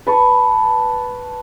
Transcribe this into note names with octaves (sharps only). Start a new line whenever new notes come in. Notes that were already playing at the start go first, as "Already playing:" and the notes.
B4 A5 C#6